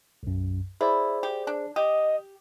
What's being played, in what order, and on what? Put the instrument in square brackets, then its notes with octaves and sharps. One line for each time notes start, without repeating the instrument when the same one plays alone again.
[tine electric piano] B1 F#2
[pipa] E4 [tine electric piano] G#4 C5 D5
[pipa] G4
D4
[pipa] G4 [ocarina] D#5 [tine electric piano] D#6